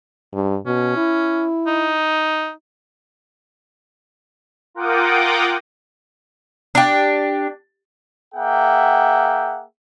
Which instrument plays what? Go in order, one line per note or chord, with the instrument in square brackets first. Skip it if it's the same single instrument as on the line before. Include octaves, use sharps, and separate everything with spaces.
[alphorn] G2
[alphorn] B2 [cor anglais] C#4
[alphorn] E4
[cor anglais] D#4
[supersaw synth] F4 A#4 F#5 G5 D6 D#6
[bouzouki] D4 G4
[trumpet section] A#3 G#4 E5 F#5 G5